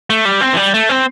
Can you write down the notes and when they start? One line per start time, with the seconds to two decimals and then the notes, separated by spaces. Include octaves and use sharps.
0.10 A3
0.25 G3
0.41 C4
0.53 E3
0.57 G3
0.74 A3
0.89 C4